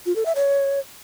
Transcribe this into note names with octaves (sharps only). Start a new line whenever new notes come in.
F4
A4
E5
C#5